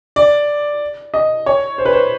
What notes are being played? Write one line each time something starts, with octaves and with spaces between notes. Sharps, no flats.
D5
D#5
C#5
C5
B4
C5